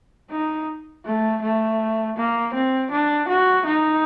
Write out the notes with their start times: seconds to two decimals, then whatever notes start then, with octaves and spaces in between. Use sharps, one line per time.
0.31 D#4
1.05 A3
1.42 A3
2.16 A#3
2.54 C4
2.91 D4
3.28 F#4
3.66 D#4